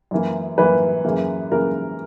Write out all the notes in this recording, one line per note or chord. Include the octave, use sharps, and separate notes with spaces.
F#2 E3 A#3
F#2 E3 A#3 B4
F#2 C#3 E3 A#3
F#2 C#3 E3 A#3 A#4